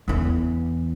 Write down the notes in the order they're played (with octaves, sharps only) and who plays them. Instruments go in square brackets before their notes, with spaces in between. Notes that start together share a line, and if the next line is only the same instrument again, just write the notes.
[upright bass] E2 E3